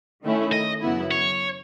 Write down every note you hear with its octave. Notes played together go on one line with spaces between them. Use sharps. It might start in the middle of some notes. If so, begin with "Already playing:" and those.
D#3 A3 C#4 E4
D#5
F#2 C#3 F#3 B3 E4
C#5